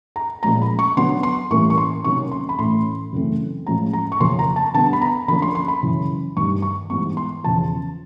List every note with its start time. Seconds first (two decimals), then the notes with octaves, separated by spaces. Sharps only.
0.16 A#5
0.43 A#2 F3 G#3 C#4 A#5
0.61 B5
0.79 C#6
0.97 D3 F#3 B3 C6
1.23 C6
1.51 A2 E3 G3 A#3 C#4 C#6
1.70 C#6
1.78 C6
2.04 C3 D#3 F#3 A#3 C#4 C#6
2.32 C6
2.49 B5
2.58 A2 E3 A3 C#4 C6
3.13 F#2 C#3 E3 A3 C4
3.67 A2 F3 G#3 C#4 A#5
3.93 A#5
4.12 C#6
4.20 F2 C#3 F3 A#3 C#4 C6
4.39 A#5
4.56 A5
4.74 D3 G3 B3 A5
4.93 B5
5.01 A#5
5.28 D3 F3 A#3 C#4 B5
5.42 C6
5.55 C6
5.68 B5
5.83 F#2 C#3 E3
6.37 G2 D#3 G3 C#6
6.62 C#6
6.90 G#2 E3 G3 B3 C#6
7.17 C6
7.44 E2 C#3 F3 A5